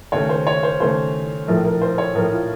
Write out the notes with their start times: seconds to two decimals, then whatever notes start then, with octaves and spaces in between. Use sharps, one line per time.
0.12 D#2 C#3 A3 C#5
0.29 C5
0.47 C#5
0.63 C5
0.80 D#2 C#3 A3 C5
1.47 A#1 A2 F3 A3 A#4
1.65 A#4
1.82 C5
1.98 C#5
2.15 A#1 A2 F3 A3 A#4
2.33 F4